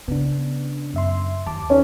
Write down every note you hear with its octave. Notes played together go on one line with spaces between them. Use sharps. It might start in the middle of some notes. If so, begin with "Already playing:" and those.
C#3 B3 D4
F#2 E5 C6
D#2 A5 D6
C#4 D#4 A4